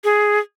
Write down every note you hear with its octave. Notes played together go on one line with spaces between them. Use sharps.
G#4